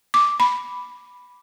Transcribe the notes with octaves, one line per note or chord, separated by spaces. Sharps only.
D6
B5